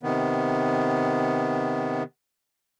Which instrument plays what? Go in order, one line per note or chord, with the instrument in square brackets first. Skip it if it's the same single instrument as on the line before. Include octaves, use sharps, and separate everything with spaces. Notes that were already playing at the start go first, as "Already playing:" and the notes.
[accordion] C3 D#3 B3